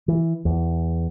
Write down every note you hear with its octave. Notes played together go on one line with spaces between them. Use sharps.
E3
E2